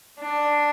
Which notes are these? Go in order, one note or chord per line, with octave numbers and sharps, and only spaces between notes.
D4